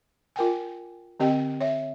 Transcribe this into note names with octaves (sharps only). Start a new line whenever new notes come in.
F4 A#4 G5 G#5
D3 C4 G4 D#5 G5
C#5 E5